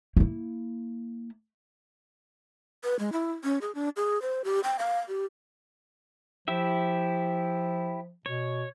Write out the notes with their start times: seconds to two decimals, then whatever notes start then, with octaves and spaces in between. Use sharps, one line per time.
0.17 A#3 E4
2.84 B4
2.99 G#3
3.12 E4
3.44 C#4
3.61 G#4
3.75 D4
3.97 G#4
4.22 C5
4.44 G4
4.64 G5
4.79 F5
5.08 G4
6.48 F3 E4 G4 E5
8.26 B2 C#5